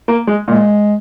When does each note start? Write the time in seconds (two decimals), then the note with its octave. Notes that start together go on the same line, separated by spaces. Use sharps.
0.08 A#3
0.27 G#3
0.47 A#2 G#3